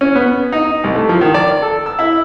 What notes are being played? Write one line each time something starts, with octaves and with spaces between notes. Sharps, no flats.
C#4
B3
D#4
C2
A3
F3
D#3
D5
A4
E6
E4